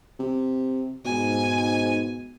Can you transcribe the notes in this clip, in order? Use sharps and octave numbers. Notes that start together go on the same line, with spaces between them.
C3
G#2 B2 G#5